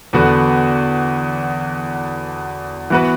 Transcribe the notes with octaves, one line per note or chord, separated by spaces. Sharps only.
E2 D3 B3 F#4
E3 B3 F#4 B4